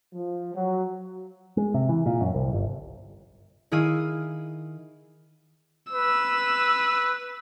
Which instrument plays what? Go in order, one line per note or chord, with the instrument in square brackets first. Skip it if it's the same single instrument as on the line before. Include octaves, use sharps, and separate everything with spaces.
[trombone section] F3
F#3
[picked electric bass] G#3
C3
E3
A#2
F#2
C2
G1
[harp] D#3 E4 G#4 F5 D#7
[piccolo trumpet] B4 [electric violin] E6